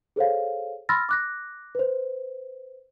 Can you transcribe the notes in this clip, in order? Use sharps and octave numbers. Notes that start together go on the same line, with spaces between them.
G#4 A4 C5 C#5 F5
B5 C6 E6 F6 A6 A#6
D6 F#6 A#6
B4 C5